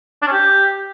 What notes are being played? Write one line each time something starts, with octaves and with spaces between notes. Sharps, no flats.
D4
C#4
G4